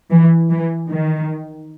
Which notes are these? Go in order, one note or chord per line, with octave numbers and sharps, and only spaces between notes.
E3
E3
D#3